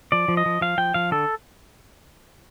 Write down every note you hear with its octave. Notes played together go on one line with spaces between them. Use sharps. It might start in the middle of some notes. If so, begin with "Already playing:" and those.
F3 D5
F3
D#5
F3
F3 F5
F3 G5
F3 F5
D3 A4